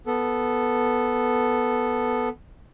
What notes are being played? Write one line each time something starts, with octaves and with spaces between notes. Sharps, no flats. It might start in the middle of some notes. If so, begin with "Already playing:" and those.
B3 A4